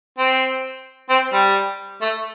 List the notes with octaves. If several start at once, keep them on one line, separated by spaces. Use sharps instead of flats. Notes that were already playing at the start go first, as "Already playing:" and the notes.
C4
C4
G3
A3